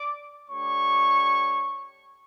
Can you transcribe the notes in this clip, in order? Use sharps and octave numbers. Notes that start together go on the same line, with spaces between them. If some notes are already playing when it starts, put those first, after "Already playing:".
Already playing: D5 D6
A3 D4 G4 C#5 C#6